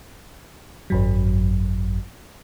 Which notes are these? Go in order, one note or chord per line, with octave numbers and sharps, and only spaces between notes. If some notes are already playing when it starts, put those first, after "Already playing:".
G#1 F#2 F#3